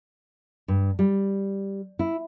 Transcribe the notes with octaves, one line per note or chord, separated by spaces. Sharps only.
G2
G3
E4